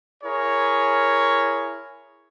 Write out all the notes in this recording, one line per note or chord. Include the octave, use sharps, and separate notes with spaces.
E4 G#4 A#4 C#5